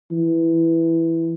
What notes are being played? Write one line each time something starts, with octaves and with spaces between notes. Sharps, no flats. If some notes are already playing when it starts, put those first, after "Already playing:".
E3